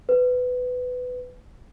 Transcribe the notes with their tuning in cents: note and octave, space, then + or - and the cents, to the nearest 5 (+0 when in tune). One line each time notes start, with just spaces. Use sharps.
B4 +15